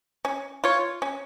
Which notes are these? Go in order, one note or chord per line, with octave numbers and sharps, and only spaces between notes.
C#4
F4 C#5
C#4